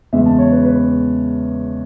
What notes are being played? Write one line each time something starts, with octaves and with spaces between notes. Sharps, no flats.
E2 C#3 G#3 B3 E5
A5
C#5
B4
B4